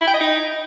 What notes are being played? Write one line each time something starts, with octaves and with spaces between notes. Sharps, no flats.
E4
G5
D#5
D#4